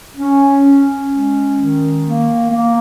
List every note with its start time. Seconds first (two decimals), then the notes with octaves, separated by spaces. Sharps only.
0.17 C#4
0.64 C#4
1.10 G#3
1.57 D#3
2.04 A#3
2.51 A#3